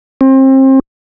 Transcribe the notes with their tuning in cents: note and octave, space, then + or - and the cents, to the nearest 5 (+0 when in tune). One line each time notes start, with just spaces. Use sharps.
C4 +30